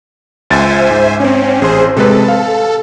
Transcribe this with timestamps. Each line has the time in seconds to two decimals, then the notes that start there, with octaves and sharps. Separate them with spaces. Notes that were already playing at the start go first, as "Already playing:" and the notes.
0.50 C#2 C5 E5 G#5 A6
0.91 G#2
1.20 C4 C#4
1.62 A1 G#4 C5 C6
1.96 C3 G#3 A4 B4
2.28 F5